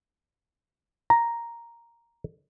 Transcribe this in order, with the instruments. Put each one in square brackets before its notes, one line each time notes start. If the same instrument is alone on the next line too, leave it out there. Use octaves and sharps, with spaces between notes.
[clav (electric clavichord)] A#5